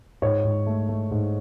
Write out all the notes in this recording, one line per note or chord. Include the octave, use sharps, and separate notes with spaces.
G#2 C#5
G#2
A3
A3
G#2